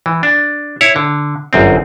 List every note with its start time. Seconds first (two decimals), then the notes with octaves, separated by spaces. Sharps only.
0.06 E3
0.23 D4
0.81 E4 C#5
0.96 D3
1.53 G1 F#2 C4